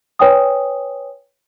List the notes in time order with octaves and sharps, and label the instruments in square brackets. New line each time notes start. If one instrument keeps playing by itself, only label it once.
[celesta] B4 C#5 G5 G#5 D#6